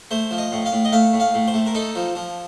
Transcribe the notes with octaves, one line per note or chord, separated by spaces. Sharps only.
A3 C5
F3
D#5
A2
F5
A2
D#5
A3 F5
A2
F5
A2
C5
A3
A#4
D#4 A4
F3
F3